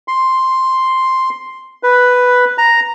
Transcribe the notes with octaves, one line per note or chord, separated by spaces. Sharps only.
C6
B4
A#5